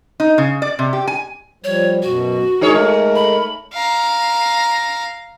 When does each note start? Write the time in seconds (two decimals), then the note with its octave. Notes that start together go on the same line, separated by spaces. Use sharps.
0.20 D#4
0.38 C#3
0.62 D5
0.79 C3
0.93 G4
1.07 G#5
1.64 F3 G3 C#5
2.02 F#2 B2 F#4
2.61 G#3 D#4 G#4 A#4 C#5
2.74 A3
3.15 B5
3.74 F5 A#5